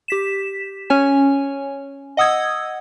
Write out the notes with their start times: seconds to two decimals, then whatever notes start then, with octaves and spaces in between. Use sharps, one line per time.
0.08 G4 B6 E7
0.90 C#4 C#5 G#5
2.17 D#5 F#5 D#6 E6 G#6